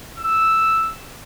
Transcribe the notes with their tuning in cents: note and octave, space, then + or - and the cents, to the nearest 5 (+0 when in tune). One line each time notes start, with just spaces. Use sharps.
E6 +0